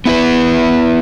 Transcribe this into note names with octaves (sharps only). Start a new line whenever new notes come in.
B3 E4 B4